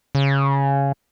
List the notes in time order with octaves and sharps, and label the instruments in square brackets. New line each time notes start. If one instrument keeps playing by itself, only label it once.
[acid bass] C#3